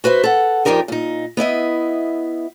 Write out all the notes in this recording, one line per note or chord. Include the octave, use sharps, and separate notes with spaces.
F#4 B4 C5 E5
A4 F#5
F2 D4 D#4 G4 A#4 D#5
A#2 D#4
B3 E4 D#5 E5